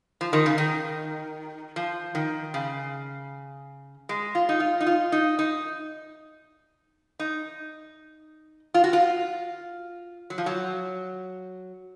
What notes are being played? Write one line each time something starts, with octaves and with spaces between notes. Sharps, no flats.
F3
D#3
C#3
D#3
F3
D#3
C#3
G#3
F4
D#4
F4
D#4
F4
D#4
D#4
D#4
F4
F#4
F4
F#3
F3
F#3